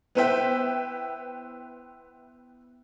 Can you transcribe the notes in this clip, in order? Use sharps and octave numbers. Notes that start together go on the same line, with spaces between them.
B3 E4 B4 C5 E5 G5